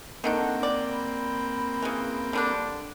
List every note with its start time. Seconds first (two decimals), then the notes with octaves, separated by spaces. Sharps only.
0.24 D#3 A3 A#3 C4 D4 F#5 G5
0.63 D5
0.92 B5
1.82 C#3 E3
2.33 D3 G3 D4